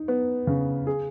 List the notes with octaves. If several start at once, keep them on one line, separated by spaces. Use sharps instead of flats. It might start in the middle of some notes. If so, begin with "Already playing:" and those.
Already playing: D#4
B3
C#3
G#4